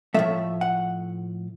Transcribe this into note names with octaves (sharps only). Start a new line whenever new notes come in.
A2 F3 A3 E5
F#5